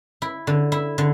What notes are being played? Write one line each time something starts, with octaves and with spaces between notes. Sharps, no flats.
E4
D3
E4
D3